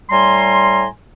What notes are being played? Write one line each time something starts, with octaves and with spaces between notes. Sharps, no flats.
A2 G3 G#5 A#5 C6